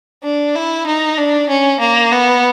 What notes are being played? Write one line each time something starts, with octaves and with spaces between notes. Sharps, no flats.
D4
E4
D#4
D4
C#4
A#3
B3